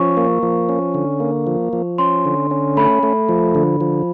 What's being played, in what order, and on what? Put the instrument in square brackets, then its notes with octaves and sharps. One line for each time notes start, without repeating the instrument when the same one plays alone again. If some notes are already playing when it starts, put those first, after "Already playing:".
Already playing: [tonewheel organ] F3 C#4 [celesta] C#6
[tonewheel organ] A#3
F3
C#4
D3
A#3
F3
F3
[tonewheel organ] C#4 [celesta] C6
[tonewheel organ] D3
C#4
[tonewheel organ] A3 [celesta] B5
[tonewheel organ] A3
F3
D3
F3